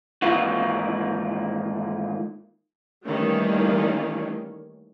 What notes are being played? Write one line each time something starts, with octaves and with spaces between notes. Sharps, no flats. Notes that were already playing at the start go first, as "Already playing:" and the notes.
G#2 D#3 E3 A#3 F4 F#4
D#3 E3 G3 A3 A#3 C#4